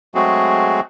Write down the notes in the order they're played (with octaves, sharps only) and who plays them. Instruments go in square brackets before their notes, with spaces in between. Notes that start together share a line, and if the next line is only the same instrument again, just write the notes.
[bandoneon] F#3 G#3 A3 C4 F#4 G#4